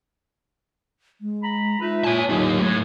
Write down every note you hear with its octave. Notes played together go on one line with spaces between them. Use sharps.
G#3
A#5 B5
D#4 F4 B4 E5
A#2 C#5 G#5 A5
A2 D3 F#3 D#4 G4
A2 D4 C#5